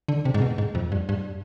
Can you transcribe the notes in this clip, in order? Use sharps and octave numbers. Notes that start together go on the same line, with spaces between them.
D3
C3
G#2
B2
G#2
F2
G2
G2